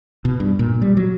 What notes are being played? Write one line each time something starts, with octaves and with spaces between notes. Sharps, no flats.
B2
G2
A#2
G3
F#3